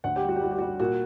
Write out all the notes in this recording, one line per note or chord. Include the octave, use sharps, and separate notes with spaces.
D2 F#5
G4
G3
F#4
G4
G3 F#4
G4
G3 F#4
A#2 F#4